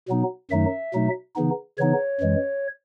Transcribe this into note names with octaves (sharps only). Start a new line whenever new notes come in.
B2 F#3 B3 D#4
F#2 D#3 F#3 A3 D#4 E5
B2 F#3 A3 D#4
C#3 E3 B3 D#4
C#3 E3 B3 D#4 C#5
F#2 E3 G#3